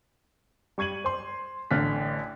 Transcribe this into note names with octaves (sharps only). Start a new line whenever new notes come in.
G3 C#6 G#6 D#7 F#7
C5 C6
A1 D3 F6 F#6 B6